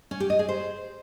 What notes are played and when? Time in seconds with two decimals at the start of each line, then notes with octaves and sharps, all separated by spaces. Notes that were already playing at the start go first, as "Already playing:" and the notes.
0.11 C#4
0.20 G4
0.30 D#5
0.39 G#4
0.49 C5